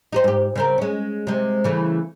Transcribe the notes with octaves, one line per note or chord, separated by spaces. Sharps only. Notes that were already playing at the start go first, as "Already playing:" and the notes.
D#4 G4 C5
G#2 G4
C#3 C4 A#4
G#3 C#4
C3 G#3
C#3 E3 A3